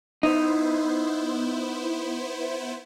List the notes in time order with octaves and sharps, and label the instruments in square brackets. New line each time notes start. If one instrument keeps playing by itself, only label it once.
[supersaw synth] B3 E4 C5 [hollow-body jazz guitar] D#4